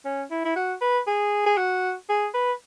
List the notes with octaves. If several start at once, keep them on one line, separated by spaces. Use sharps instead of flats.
C#4
E4
E4
F#4
B4
G#4
G#4
F#4
G#4
B4